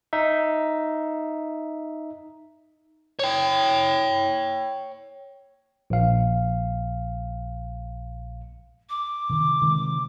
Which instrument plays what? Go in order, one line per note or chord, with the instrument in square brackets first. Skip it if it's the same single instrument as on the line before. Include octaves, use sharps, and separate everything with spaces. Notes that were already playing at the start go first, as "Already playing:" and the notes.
[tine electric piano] D#4 E5
[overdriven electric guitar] C#5 G5
[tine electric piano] A#1 F5
[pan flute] D6
[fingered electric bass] C3 D#3
C3 D#3 G#3